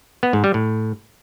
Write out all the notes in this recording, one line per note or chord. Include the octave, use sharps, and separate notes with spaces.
B3
G#2
G3
A2